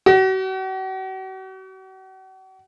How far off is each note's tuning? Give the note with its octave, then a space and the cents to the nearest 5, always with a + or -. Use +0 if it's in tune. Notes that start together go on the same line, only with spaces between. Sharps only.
F#4 +40